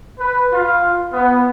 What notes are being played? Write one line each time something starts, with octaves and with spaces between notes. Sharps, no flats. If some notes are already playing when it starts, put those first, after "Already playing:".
B4
F4
B3